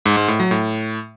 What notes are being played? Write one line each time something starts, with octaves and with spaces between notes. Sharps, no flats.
G#2
G#2
A2
F#3
A2